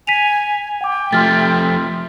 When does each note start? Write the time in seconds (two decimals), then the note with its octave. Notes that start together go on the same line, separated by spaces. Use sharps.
0.07 G#5 B6 D#7 F7
0.81 F#5 G5 D6
1.13 F3 A3 C6 F6 A6